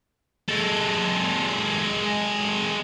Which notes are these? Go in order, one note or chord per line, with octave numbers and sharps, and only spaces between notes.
G#3 A4